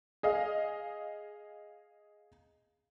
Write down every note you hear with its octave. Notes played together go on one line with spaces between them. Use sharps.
G#4 D#5 F5